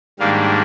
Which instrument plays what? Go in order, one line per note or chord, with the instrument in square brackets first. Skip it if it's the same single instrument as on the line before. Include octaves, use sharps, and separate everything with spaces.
[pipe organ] G#2 D#3 G3 A#3 D4 F5